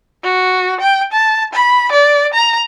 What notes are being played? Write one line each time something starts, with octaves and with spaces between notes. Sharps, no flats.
F#4
G5
A5
B5
D5
A#5